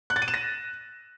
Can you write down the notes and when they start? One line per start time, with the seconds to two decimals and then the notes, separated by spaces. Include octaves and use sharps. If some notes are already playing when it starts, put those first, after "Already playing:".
0.10 F#6
0.16 A6
0.22 D#7
0.28 E7
0.34 A#6